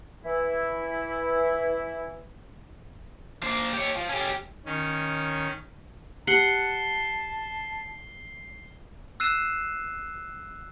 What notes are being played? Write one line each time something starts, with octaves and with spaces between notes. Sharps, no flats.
E3 E4
A#3 C5
G4 C#5
F3
C#4 G4
D#3 C#4
G4 F#5 A5 C7 G7
E6 F#6 C7 D#7 E7